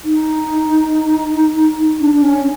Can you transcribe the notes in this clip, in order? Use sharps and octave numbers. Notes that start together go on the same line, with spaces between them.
D#4
D4
D4
C#4